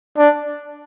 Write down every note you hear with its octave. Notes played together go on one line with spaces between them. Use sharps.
D4